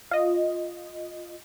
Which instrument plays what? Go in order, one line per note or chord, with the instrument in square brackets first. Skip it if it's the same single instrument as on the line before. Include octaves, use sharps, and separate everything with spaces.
[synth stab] F4 D#5